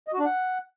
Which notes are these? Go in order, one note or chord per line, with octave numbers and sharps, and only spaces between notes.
D#5
F#4
D4
F#5